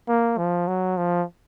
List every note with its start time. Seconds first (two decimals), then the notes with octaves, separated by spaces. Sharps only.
0.08 A#3
0.38 F3
0.68 F#3
0.97 F3